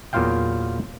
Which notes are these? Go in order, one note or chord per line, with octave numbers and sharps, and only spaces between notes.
E2 A#2 F#3 F4 F5 G5